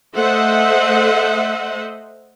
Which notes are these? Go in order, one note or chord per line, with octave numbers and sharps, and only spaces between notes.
A3 A4 C5 D#5 E5 F#5